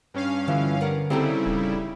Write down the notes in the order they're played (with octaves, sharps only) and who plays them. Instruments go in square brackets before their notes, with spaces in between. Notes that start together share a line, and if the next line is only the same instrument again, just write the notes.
[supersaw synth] G2 C#4 F5
[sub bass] D3 [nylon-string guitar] E3 F3
[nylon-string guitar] B3 A#4 F#5
[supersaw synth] C#3 G3 E4 [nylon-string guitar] C4 D#4 A4
[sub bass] D1